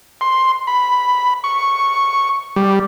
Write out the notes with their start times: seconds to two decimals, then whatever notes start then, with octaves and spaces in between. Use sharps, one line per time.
0.21 C6
0.67 B5
1.44 C#6
2.56 G3